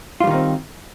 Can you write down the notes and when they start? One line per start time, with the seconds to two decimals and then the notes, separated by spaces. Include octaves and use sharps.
0.20 F4
0.24 G3
0.27 D#3
0.31 D#4
0.34 C4